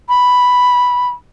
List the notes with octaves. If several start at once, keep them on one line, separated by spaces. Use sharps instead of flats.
B5